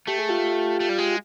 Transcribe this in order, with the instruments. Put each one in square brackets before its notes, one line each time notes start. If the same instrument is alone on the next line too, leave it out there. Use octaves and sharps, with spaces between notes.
[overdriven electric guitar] A3 [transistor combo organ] G4
[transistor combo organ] G#4
F4 G4
[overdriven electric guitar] A3
G3
G#3